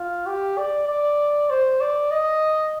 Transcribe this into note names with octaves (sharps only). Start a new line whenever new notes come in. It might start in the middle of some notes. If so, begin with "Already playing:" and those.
Already playing: F4
G4
D5
D5
C5
D5
D#5